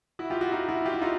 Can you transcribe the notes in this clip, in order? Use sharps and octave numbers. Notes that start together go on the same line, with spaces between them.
E4 F#4
F4 G4
E4 F#4
D#4 F4
E4 F#4
F4 G4
E4 F#4
D#4 F4